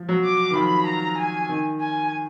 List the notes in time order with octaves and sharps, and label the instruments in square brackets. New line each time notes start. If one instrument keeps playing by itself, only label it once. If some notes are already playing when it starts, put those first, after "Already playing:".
Already playing: [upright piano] F3
F#3
[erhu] D6
[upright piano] D#3
[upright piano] F3 [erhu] B5
[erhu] A#5
G#5
[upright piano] D#3
[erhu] G#5